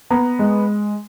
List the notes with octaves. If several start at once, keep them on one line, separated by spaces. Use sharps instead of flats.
B3 A#5
G#3